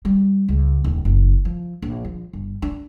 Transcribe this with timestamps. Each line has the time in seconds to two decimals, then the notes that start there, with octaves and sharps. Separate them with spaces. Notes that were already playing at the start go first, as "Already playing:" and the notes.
0.05 G3
0.48 C#2
0.84 D#1
1.05 F#1
1.45 F3
1.82 A#1
2.05 F3
2.33 G1
2.62 D4